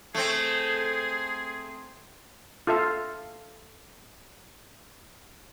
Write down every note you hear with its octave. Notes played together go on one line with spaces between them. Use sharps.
A3 C4 G#4
F4 A4 E5 F5